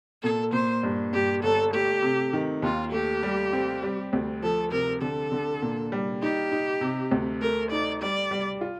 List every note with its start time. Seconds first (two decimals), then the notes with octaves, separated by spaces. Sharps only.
0.23 A#2 A4
0.53 A#2 C5
0.83 G2
1.13 G2 G4
1.43 G1 A4
1.73 A3 G4
2.03 C3
2.33 D#3
2.62 D#2 F4
2.92 A3 G4
3.23 G3
3.53 C4
3.83 G3
4.13 D2
4.43 F3 A4
4.72 C3 A#4
5.02 D3 A4
5.32 D3
5.62 A#2
5.92 G3
6.22 D#4 G4
6.52 D#4
6.81 C3
7.11 D2
7.41 A3 A#4
7.71 D#4 D5
8.02 G3 D5
8.31 G3
8.61 F4